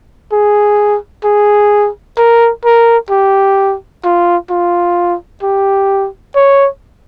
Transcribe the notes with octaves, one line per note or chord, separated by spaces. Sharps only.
G#4
G#4
A#4
A#4
G4
F4
F4
G4
C#5